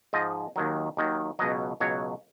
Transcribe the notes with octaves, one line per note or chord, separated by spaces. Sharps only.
G#2 F3 D#5
D#2 D#3 F#3
D#2 D#3 F#3
C#2 B2 F#3 D#5
C#2 B2 F#3 C#5